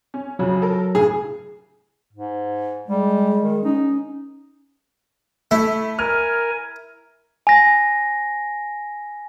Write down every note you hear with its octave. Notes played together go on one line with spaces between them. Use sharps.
C#4
F2 C#3 F3 F#3
A4 A#4
A2 C#3 G#4
G#2
G3 G#3
D#3
C#4 D#4
A3 E4
A#4 G#5 F6
G#5 A#6